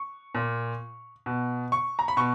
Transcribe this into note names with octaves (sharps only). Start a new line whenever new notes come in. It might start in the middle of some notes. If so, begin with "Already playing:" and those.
Already playing: C#6
A#2
B2
C#6
A#5
B5
B2 C#6